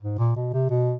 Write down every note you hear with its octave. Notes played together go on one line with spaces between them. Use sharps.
G#2
A#2
B2
C3
B2